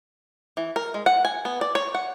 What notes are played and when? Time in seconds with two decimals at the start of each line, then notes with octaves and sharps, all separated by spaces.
0.57 E3
0.76 A#4
0.94 G#3
1.06 F#5
1.25 G#5
1.45 B3
1.61 D5
1.75 C#5
1.95 F#5